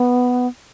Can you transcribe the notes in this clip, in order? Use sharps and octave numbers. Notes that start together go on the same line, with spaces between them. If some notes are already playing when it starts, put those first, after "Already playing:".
Already playing: B3